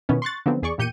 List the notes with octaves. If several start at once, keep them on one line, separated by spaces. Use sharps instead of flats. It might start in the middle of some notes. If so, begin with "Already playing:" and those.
B2 D#3 E3 B3 C#4
C6 C#6 F#6 A6
D3 D#3 F3 F#3 B3 C4
E2 G#4 D5 C#6
E2 A#2 G4 G6 C#7 D#7